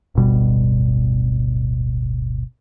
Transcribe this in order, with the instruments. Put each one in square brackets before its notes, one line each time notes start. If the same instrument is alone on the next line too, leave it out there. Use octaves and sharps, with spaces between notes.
[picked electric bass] D1 G1 B2 G3